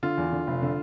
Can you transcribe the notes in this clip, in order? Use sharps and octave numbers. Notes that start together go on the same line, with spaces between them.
D3 F4
E2
D3
F1
D3